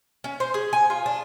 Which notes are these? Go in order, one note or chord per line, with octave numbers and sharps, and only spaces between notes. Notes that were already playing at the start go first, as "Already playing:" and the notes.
C#4
C5
G#4
G#5
F4
D4